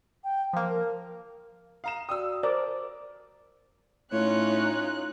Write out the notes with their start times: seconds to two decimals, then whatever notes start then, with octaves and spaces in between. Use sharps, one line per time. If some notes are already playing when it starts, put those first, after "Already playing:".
0.24 G5
0.53 F3 A#3 F5
0.70 A#4
1.84 F5 A#5 D#6 E7
2.09 F#4 D5 G5 D#6 E6
2.43 A#4 C5 D5
4.12 A2 C#4 D#4 F4 C#5 F#6